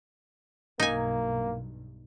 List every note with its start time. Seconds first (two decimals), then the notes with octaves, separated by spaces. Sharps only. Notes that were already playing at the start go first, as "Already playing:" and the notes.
0.80 B1 G2 A#3 D#4 G#5